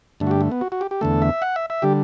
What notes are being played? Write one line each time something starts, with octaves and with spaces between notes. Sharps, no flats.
G2 D3 A3
F#4
G4
A3
B3
F#4
F#4
G4
G4
E2 D3 A3 A4
E5
F#5
E5
E5
D3 G3 G4